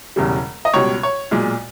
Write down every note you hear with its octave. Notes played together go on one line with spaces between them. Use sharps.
E1 E2 C#3 G3
D#5
C#2 B2 G3 C#5
C#5
B1 A#2 G#3